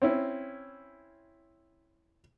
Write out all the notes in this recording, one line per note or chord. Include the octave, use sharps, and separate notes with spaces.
C4 C#4 E4